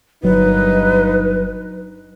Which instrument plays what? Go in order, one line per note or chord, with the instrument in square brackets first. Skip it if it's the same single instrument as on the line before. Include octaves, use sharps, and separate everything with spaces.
[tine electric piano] G1 F#3 [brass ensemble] G2 A#2 D#4 [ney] B4